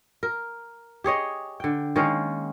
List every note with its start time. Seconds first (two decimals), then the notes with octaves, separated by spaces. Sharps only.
0.23 A#4
1.04 G4 G#4 C#5 D#5
1.60 D3 G5
1.96 D#3 G#3 A#3 C#4